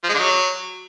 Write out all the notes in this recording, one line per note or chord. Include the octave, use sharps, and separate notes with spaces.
F3
G#3
D3
F#3